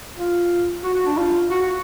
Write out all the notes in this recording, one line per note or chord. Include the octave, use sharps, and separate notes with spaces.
F4
F#4
F#4
D4
F4
F#4
F#4